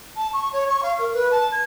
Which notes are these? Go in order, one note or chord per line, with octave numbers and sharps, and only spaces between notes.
A5
C#6
C#5
C#6
F5
A#4
B4
A5
G#6